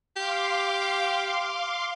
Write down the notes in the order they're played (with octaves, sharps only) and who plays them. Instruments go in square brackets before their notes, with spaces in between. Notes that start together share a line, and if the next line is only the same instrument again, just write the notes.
[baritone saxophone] G4 [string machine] F5 C6 D6